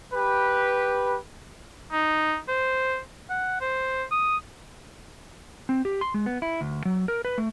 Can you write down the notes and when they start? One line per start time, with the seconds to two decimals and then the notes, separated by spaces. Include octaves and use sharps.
0.13 G4 B4
1.92 D#4
2.48 C5
3.30 F#5
3.61 C5
4.11 D#6
5.69 C4
5.85 G4
6.01 C6
6.14 G#3
6.26 B3
6.42 E4
6.61 D2
6.85 F#3
7.08 A#4
7.25 B4
7.38 A3